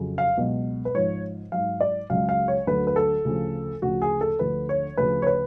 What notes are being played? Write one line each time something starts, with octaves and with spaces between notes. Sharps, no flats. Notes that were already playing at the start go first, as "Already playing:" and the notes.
Already playing: F2 C#3 F#3
F5
C#2 B2 F#3
B4
G#2 F3 C#5
G#2 F#3 F5
D5
C#2 C#3 F#3 F5
F5
C#5
D2 D3 F#3 B4
B4
A4
D2 C#3 F3
D2 C#3 F3 F#4
G#4
A4
D2 D3 F3 B4
C#5
D2 C#3 F3 B4
C#5
B4